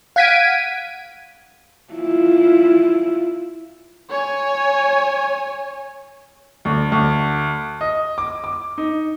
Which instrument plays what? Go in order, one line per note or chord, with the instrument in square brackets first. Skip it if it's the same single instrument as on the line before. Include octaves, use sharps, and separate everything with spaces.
[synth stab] F5 F#5 G#6 B6 D7 D#7
[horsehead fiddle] E4 F4
[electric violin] C#5 G#5
[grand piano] D2
D2
D#5
D6
D6
D#4